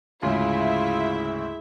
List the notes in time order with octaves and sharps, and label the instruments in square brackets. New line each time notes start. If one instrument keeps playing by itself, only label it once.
[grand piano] D2 G#2 C#3 [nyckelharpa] E4 G#4 [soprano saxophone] F4 [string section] E5